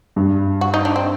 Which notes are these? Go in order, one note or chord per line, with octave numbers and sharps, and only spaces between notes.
G2
F#4
D#4
D4
C4